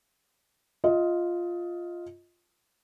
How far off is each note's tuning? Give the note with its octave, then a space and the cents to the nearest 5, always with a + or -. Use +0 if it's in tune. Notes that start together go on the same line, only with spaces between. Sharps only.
F4 +0 D#5 +15